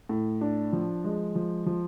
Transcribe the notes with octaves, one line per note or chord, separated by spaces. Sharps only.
A2
D4
F3
G#3
F3
F3